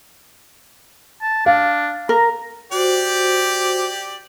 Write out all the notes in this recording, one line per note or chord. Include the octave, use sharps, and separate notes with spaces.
A5
D4 F5
A#4 A#5
F#4 G4 C5 D5